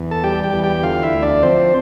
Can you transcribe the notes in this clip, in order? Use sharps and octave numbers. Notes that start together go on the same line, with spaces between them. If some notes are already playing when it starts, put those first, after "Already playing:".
Already playing: E2
A4 A5
G3 G4 G5
G4 G5
E2
G4 G5
D3 F4 F5
E4 E5
D2
D4 D5
F3 C4 C5